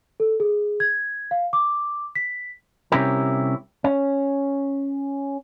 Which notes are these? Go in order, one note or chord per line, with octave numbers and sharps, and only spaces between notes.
A4
G#4
G#6
F5
D6
B6
C3 G3 C#4 E4 G4 A#4
C#4